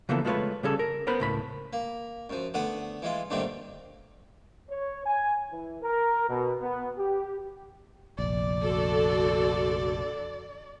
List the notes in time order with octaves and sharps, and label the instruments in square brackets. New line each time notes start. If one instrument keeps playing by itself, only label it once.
[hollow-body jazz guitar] C#3 E3 F3 A#3 B3 A4
G#3 A3 F4 G4 B4 C#5
C#3 G3 C#4 G#4 A4
A#4
B3 A#4 C5 B5
C#2 A2 B5
[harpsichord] A#3
F#2 F3
D3 A3 B3 F#5 D#6
E3 G#3 F4
G2 A#2 D3 D#3 A3 C4
[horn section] C#5
G#5
E3
A#4
B2
B3
G4
[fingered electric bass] F1 A#1 [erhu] D5
[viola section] D3 A4 [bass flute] F#4